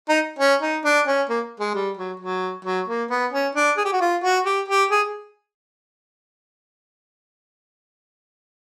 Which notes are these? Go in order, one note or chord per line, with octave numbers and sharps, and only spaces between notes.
D#4
C#4
D#4
D4
C#4
A#3
G#3
G3
F#3
F#3
F#3
A#3
B3
C#4
D4
G#4
G4
F#4
F4
F#4
G4
G4
G#4